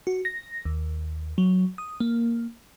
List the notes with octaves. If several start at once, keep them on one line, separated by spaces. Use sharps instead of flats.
F#4
A#6
D#2
F#3
D#6
A#3